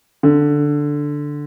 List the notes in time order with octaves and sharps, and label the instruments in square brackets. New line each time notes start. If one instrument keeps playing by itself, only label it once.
[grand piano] D3